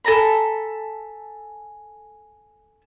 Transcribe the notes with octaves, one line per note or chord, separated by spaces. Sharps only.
A4 G#5 A#5 B5